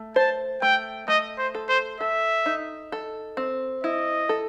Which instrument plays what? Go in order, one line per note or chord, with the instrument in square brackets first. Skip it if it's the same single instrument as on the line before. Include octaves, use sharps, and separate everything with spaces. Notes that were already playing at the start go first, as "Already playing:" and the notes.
Already playing: [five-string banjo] A3
[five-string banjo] C5 [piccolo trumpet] A5
[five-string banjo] A3 [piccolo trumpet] G5
[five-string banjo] A3 [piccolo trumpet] D#5
[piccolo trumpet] C5
[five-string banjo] A4
[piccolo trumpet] C5
[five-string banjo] A4 [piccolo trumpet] E5
[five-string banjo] D#4
A4
C4
[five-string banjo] E4 [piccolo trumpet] D#5
[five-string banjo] A4